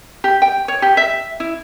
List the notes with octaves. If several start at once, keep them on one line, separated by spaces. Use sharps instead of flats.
G4
G5
C#5
G4
E5
E4